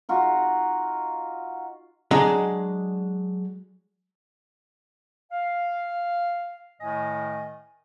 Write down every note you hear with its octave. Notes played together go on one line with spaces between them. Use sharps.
D#4 F4 F#4
F#3 G#3 D4 G#4 D#5
F5
A2 D#3 A3 D#5 G#5